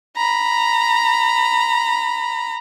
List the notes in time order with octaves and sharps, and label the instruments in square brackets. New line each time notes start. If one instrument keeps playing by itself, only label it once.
[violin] A#5 B5